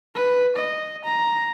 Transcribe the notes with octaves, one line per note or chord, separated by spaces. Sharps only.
B4
D#5
A#5